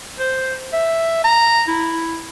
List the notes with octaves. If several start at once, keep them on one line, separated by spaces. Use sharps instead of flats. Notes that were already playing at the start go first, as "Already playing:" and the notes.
C5
E5
A#5
E4